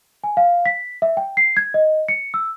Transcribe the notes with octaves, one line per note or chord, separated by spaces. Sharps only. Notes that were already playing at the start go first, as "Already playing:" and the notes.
G#5
F5
B6
E5
G5
C7
G#6
D#5
C#7
E6